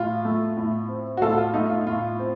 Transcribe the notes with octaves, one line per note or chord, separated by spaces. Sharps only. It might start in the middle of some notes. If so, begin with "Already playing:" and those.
Already playing: A2 F4
A3
A2
C4
F#4
A2 F4 A4
F4
A3 D#4
F4
A2 F4
C4